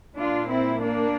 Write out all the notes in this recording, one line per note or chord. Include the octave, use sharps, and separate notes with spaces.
A#2 D4 F4
C4 E4
A#3 D4